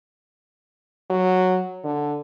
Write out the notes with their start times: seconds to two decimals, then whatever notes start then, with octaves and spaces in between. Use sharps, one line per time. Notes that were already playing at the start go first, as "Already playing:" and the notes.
1.10 F#3
1.84 D3